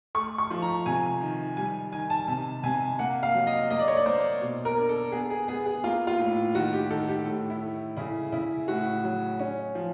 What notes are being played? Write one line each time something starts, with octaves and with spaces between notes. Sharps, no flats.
A3 C#6
C#6
F3
A#5
C3 G#5
D#3
G3 G#5
D#3 G#5
A5
C3 A5
C3 G#5
A#3 F#5
F5
F#3
D#5
A#3 D#5
D5
C#5
D5
A#3 C5
B2
A#4
D4
A4
B3 G#4
G#4
B3 G#4
G#4
A#3 F4
F4
A2
D#3 F#4
G4
D#3 A4
G4
A2
E4
A3
C#3 E4
C#3 E4
A2 F#4
F#3
C#4
F3